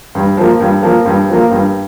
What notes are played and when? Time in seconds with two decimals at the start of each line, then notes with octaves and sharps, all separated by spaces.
0.15 G2
0.37 F3 A#3
0.60 G2
0.83 F3 A#3
1.06 G2
1.29 F3 A#3
1.51 G2